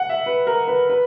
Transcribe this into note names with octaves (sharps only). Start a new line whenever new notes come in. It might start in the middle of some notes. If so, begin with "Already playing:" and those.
Already playing: F#5
E5
B4
A#4
B4
B4